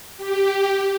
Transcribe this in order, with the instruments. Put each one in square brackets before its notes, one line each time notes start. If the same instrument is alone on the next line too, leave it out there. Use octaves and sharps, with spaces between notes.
[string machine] G4